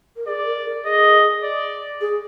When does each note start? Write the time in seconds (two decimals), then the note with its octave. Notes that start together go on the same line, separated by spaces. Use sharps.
0.16 A#4
0.27 G#4 D5
0.46 A#4
0.66 A#4
0.85 G#4 D#5
1.43 D5
2.01 G#4